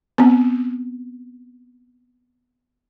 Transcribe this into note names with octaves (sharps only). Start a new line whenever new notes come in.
B3 C4